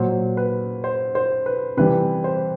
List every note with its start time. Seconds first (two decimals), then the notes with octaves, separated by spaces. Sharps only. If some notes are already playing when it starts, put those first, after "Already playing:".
Already playing: A#2 F#3 C5
0.37 B4
0.84 C5
1.15 C5
1.46 B4
1.77 C3 E3 G3 B4
2.24 C5